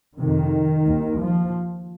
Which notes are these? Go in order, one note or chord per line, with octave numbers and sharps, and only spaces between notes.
F2 C3 D#3
D#2
F3